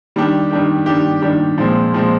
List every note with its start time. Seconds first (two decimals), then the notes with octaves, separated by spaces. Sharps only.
0.16 D#3 G3 D4 G4
0.51 D#3 G3 D4 G4
0.86 D#3 G3 D4 G4
1.22 D#3 G3 D4 G4
1.58 A#2 F3 G#3 C4
1.94 A#2 F3 G#3 C4